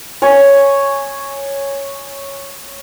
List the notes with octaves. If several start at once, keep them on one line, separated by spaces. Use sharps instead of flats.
C#5 G#5